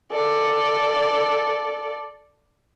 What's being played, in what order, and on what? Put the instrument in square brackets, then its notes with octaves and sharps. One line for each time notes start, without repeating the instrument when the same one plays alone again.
[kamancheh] A4 D5